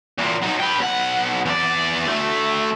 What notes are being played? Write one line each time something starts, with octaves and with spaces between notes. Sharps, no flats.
E2 A#2
F#3 D#4
B4 G5
B1 F#5
E2 D5
D2 A3